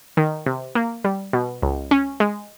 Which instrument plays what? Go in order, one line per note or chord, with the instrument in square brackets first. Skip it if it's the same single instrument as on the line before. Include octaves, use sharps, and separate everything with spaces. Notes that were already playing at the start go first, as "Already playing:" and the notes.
[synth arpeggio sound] D#3
C3
A#3
G3
B2
C#2
C#4
G#3